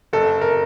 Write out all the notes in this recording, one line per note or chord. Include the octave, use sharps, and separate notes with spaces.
F#1 A4
A#4